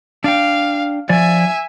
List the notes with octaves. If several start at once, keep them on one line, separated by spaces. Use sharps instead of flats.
D4 F5 G5
F3 D5 E5 G#5